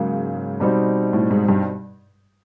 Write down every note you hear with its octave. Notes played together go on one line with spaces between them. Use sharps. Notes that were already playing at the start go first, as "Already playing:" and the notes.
Already playing: G#2 C#3 F#3 A#3
B2 G3 C4 D#4
A2
G#2
G2